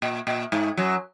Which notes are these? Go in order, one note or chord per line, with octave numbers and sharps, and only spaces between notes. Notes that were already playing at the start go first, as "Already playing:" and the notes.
A#2
A#2
G#2
F#2 F#3